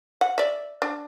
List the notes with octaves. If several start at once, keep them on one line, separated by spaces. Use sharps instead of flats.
F#5
D5 E5
D4